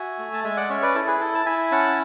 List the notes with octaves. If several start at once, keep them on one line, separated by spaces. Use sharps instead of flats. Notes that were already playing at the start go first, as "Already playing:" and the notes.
Already playing: F#4 E5 G#5
A3
A5
G#3 E5 G#5
D5 F#5
C#4 C#5 E5
B4 D5
E4 A4
G#4 B4
E4 A4
A5
E4 E5 G#5
C#4 F#5 A5